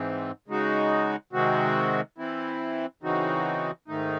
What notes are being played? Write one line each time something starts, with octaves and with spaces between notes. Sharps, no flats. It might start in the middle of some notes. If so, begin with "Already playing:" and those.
Already playing: G#2 E3 C4
C#3 G#3 D#4 F#4
C3 D#3 G#3 C4 F#4
E3 C4 E4
C#3 E3 C4 D#4 F#4
G#2 D#3 A3 D#4